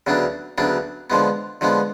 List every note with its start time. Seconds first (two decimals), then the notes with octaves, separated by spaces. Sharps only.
0.07 D2 C#3 F#3 B3 D4
0.58 D2 C#3 F#3 B3 D4
1.10 D3 F3 G#3 B3
1.61 D3 F3 G#3 B3